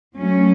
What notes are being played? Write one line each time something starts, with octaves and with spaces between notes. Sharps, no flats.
F#3 A3 C#4